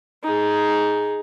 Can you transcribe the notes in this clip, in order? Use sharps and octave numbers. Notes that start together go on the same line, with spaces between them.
D#4 G#4